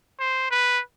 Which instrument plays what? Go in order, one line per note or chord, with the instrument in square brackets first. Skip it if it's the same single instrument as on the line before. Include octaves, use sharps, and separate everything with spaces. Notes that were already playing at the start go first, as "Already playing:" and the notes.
[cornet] C5
B4